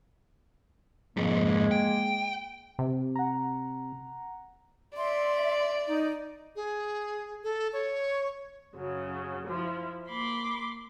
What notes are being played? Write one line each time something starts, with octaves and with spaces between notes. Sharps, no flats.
F2 G#2 G#3 A#3
G5
C3
F#5 A#5
D5 E5 C6
D#4
G#4
A4
C#5
F#2 C#3 F#3
F3 E4
A#3 B5 C6 D6